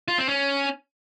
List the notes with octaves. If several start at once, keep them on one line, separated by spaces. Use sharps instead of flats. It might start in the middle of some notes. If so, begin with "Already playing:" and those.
F4
C4
C#4